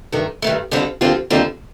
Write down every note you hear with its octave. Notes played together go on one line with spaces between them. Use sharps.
G2 D#3 A3
G2 D#3 A3
D#2 D3 G3 C4 F4
D#2 D3 G3 C4 F4
D#2 D3 G3 C4 F4